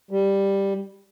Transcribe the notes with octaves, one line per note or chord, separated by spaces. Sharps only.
G3